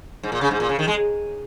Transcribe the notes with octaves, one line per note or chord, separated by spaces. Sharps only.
G#2
A#2
C#3
G#2
A#2
C#3
D#3
G#3